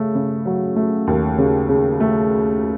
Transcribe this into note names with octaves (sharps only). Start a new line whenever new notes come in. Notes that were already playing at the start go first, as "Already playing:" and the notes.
Already playing: C#3 A3
C#3
F#3
A3
D#2
C#3
C#3
A3